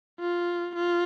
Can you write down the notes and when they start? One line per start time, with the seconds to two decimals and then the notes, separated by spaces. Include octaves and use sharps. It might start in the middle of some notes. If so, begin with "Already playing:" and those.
0.20 F4
0.76 F4